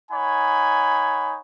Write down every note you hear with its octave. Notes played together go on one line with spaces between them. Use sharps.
D#4 C#5 F#5 G#5 B5